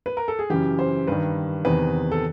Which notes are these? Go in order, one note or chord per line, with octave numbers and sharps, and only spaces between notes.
B4
A#4
A4
G#4
F#2 C#3 E3 G4
C5
G2 D#3 B4
E2 C3 D#3 B4
A4